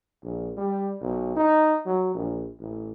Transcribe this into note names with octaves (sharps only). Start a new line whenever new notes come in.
A#1
G3
B1
D#4
F#3
A#1
A1